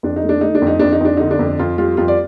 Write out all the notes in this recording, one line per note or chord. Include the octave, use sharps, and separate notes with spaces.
F2 D4
D#4
A3
D4
A3 D#4
D4
F2
D#4
F2 D4
D#4
F2 D4
D3 D#4
D4
F2
F2 F4
G3 F4
F2 F4
D5